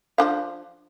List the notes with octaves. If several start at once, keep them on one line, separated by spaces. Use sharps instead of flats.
F3 D4 F5